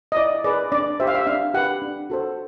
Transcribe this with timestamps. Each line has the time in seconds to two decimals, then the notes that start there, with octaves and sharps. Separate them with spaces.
0.12 D#5
0.16 E4 D5
0.44 G#4 B4 D5
0.72 D4 D5
1.00 G4 C5 E5
1.07 F5
1.15 E5
1.27 D4 F5
1.54 G4 B4 F#5
1.82 D4
2.10 F#4 A4 C5